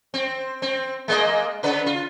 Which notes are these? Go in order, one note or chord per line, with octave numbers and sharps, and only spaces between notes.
C4
C4
G#3 A#3 D#5
C#3 B4
F4